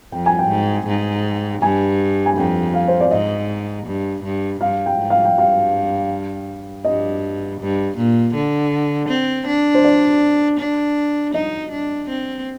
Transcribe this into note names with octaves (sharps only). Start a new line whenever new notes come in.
F2 G5
G#5
G5
G#2
G#2
G2 G#5
G#5
F2 G5
F5
C5
D5
G#2 D#5
G2
G2
G2 F5
G5
G#2
F5
G5
G2 F5
G2 D#5
G2
A#2
D3
C4
D4
C5
D5
D4
D#4 D#5
D4
C4